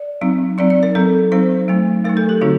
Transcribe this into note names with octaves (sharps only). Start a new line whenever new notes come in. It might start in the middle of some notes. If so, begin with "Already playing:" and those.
Already playing: D5
F#3 C4 D#4
F#3 C4 D#4 D5
D5
A#4
F#3 C4 D#4 A4
F#3 C4 D#4 C5
F#3 A3 D#4
F#3 A3 D#4 A#4
A4
G4
D3 F#3 C4 D#4 F#4